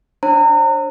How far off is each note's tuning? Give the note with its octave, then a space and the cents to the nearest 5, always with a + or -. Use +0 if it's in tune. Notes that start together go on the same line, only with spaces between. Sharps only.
D4 +10 C5 +45 A#5 -35